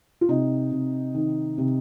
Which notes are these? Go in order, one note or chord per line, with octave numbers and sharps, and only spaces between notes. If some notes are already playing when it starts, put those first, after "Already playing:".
F4
C3 D#4
C3
D#3
C3